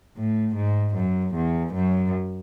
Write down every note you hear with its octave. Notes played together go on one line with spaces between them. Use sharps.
A2
G#2
F#2
E2
F#2